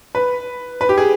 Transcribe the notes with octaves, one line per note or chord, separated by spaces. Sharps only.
B4
B4
G4
G#4